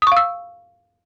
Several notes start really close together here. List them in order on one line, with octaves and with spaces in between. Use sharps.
D#6 C#6 F5 E6